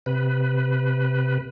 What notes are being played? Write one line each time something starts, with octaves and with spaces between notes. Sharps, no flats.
C3 B4